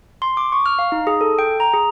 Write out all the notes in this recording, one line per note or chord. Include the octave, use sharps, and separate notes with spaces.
C6
D6
C#6
F6
F5
D#4
G#4
A4
G5
A#5
G#4